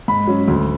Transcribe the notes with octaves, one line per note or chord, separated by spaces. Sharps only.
G#2 B5
F#3 C#4
D2